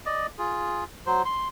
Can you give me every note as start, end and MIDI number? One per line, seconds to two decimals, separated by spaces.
0.06 0.27 74
0.06 0.27 75
0.38 0.84 65
0.38 0.84 68
1.06 1.22 54
1.06 1.22 72
1.25 1.48 84